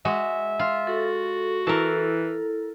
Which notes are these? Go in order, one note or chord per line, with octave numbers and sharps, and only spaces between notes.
G#3 F#4 E5
F4
F#4 A4
E3 E4 A4 A#4 A5